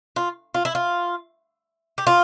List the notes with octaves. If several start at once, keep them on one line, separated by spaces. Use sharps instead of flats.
F4
F4
E4
F4
G4
F4